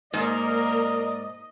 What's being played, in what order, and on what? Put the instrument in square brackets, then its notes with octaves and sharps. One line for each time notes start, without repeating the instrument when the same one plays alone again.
[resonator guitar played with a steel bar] G#2 [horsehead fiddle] A#3 A#4 [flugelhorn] D5 [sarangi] D#5